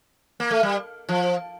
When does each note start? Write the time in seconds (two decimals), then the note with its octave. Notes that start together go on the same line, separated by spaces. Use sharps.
0.40 A#3
0.51 A3
0.63 G3
1.09 F3